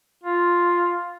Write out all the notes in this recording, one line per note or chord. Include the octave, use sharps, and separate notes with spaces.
F4